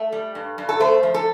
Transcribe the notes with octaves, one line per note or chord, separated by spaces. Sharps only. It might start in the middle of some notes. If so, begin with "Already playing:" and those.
Already playing: A3
G3
G2
G2
A4
A3 C5
F3
A4